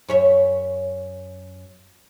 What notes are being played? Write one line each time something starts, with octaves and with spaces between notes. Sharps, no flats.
F#2 C#5 E5